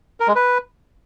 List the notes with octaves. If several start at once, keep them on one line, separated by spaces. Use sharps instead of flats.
A#4
G#3
B4